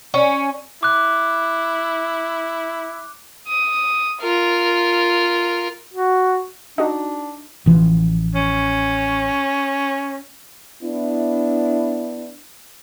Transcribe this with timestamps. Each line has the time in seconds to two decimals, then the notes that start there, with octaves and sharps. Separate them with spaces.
0.14 C#4
0.83 E4 D6 F#6
3.47 D#6
4.22 F4 A#4
5.94 F#4
6.78 D4 D#4 F#4
7.66 A1 E3 F3
8.35 C#4
10.83 B3 D4 E4